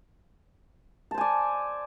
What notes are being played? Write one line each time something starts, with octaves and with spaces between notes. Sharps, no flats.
C5 D5 G#5 A5